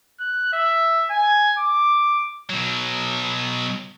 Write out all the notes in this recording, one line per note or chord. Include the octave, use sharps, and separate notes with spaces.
F#6
E5
G#5
D6
B2 F#3